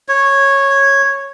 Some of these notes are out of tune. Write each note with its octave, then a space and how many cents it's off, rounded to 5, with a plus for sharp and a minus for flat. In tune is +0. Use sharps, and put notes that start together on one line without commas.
C#5 -10